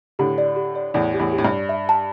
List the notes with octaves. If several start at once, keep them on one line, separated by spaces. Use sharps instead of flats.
A2 D3 G4
D5
G4
D5
E2 A2 D5
G4
E2 A2
G4
A2
G2
D5
E5
A5